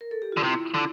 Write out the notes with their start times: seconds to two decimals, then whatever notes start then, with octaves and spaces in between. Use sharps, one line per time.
0.01 A#4
0.11 A4
0.22 G4
0.32 D3 F4
0.43 C3 E4
0.74 D3